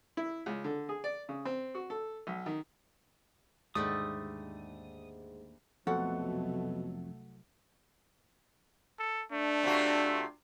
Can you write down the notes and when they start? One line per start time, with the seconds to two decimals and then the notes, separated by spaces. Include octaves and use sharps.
0.17 E4
0.46 C#2
0.64 D3
0.89 G#4
1.04 D5
1.29 C#3
1.45 C4
1.75 F#4
1.90 A4
2.27 B1
2.46 D#3
3.75 D#2 G#2 D3 G3 A3 D#6
5.87 C2 F2 B2 F#3 A3 F#4 A4 F#5
8.99 A4
9.32 A3 D4
9.63 C3 F4 F#4